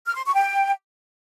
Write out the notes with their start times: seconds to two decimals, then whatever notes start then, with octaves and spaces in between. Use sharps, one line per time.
0.06 F6
0.15 C6
0.25 C#6
0.34 G5